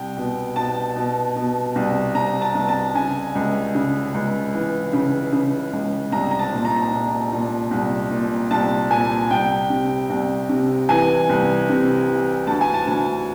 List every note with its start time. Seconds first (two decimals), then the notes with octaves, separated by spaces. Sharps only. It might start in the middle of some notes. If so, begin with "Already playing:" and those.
Already playing: C2 G5
0.17 B2
0.56 B2 A5
0.96 B2
1.36 B2
1.76 C2
2.15 C2 A#5
2.42 A5
2.55 C2
2.68 A5
2.95 C#3 G#5
3.35 C#2
3.75 C#3
4.14 C#2
4.54 E3
4.93 C#3
5.32 C#3
5.73 C#2
6.12 C2 A#5
6.31 A#5
6.39 A5
6.53 A#2
6.65 A#5
6.91 A#2
7.32 A#2
7.71 C2
8.11 A#2
8.51 C2 A5
8.90 A#2 G#5
9.30 C2 G5
9.70 C3
10.10 C2
10.49 C3
10.89 E3 G#5
11.29 C2
11.69 C3
12.08 E3
12.47 D2 A5
12.61 G#5
12.74 A5
12.87 D2 A5